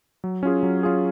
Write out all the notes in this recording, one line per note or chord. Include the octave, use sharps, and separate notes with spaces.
F#3
C#4 F4 G#4
F#3
C#4 F4 G#4